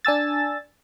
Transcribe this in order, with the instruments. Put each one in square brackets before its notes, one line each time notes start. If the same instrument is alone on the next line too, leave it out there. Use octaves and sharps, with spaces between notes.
[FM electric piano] D4 G#5 E6 A6